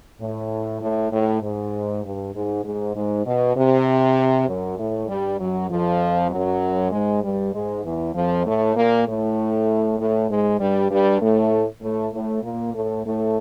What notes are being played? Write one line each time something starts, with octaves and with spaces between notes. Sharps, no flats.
A2
A2
A2
G#2
G2
G#2
G#2
G#2
B2
C3
F#2 F#3
A2 A3
G2 G3
F#2 F#3
F2 F3
F#2 F#3
G#2 G#3
G2 G3
G#2 G#3
E2 E3
F2 F3
A2 A3
A#2 A#3
A2 A3
A2 A3
G#2 G#3
G2 G3
G2 G3
A2 A3
A2 A3
A2 A3
A#2 A#3
A2 A3
A2 A3